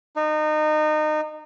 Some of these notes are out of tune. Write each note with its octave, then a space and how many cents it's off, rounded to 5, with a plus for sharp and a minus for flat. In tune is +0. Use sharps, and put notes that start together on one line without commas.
D#4 -25